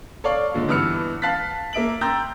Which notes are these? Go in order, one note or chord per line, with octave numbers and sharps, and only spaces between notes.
A4 C#5 D5 F5
A#2 D3 G#3
G2 E3 B3 E6 F6 C#7
F5 A5 F#6 A6 B6
A#3 E5 D7 F#7
G5 A#5 C6 E6 G6 A6